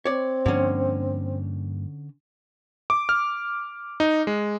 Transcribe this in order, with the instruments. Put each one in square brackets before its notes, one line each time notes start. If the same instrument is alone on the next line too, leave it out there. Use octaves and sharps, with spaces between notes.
[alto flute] C4 [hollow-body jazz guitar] C#5 D5
[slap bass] G2 F3 A#3 [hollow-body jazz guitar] D3 C#4
[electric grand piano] D6
F6
D#4
G#3